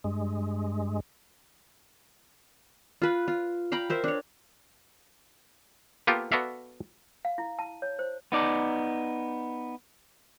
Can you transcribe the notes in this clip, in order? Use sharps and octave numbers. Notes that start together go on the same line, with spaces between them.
G2 G#3
F4 B4
F4
F5 G5 A#5 B5
A#4 C5 E5
D4 C#5
A#3 B3 F4 G4 A4
B3 F#4 A4 D5 E5 F5
F5
E4
A5
C#5
C5
B3 D#4 D5